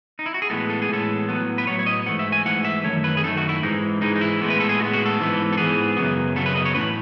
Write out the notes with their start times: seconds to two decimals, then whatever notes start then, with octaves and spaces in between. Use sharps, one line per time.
0.19 D#4
0.26 E4
0.34 F#4
0.42 G#4
0.50 A2 E3 G#3 B3 A4
0.70 A4
0.82 G#4
0.89 A2 E3 G#3 B3 A4
1.28 A2 F#3 B3
1.58 B4
1.67 A2 F#3 B3 C#5
1.79 C#5
1.86 D#5
2.06 G#2 E3 A3 F#5
2.19 E5
2.32 G#5
2.45 G#2 E3 A3 F#5
2.65 E5
2.84 F#2 D#3 A3 C#5
3.04 B4
3.17 G#4
3.23 F#2 D#3 A3 A4
3.37 F#4
3.49 E4
3.63 G#2 E3 G#3 D#4
4.01 G#2 E3 G#3 D#4
4.16 D#4
4.21 E4
4.41 A2 G#3 B3
4.50 B4
4.60 A4
4.69 G#4
4.80 A2 G#3 B3 F#4
4.93 F#4
5.06 A4
5.19 G#2 E3 B3
5.53 A4
5.57 G#2 E3 B3 G#4
5.97 F#2 C#3 F#3 B3
6.36 F#2 C#3 F#3 B3 A4
6.46 B4
6.55 D#5
6.65 C#5
6.75 A2 E3 A3 B4